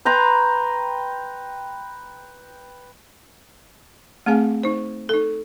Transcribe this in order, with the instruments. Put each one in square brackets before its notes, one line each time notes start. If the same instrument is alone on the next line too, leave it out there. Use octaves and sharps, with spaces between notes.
[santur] B4 G5 A#5 C6
[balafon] A3 C4 G#4 F5 G#5
D#4 C5
D#4 A4